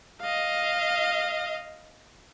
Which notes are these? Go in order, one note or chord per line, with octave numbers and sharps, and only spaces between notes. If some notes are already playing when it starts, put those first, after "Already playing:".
D#5 F5